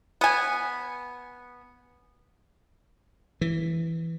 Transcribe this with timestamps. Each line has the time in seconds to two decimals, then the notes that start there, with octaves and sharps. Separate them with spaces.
0.21 B3 G#5
3.41 E3